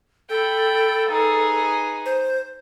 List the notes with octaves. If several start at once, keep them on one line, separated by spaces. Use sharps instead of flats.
A4 G5 B5
D#4 G#4 B4
C5